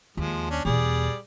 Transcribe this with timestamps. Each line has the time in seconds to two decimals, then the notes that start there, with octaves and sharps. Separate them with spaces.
0.17 D#2 F3 G#3
0.50 C#4 D4
0.65 E2 B2 G3 G#4 D5